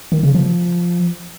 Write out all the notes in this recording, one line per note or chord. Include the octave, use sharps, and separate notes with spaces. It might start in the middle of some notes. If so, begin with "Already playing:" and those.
D#3
C#3
F3